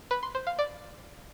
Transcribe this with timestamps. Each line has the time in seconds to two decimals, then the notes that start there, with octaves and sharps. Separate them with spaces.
0.11 B4
0.23 C6
0.35 C5
0.47 F5
0.59 D5